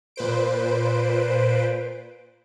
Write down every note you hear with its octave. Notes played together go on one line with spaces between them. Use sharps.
A#2 B4 C5 D7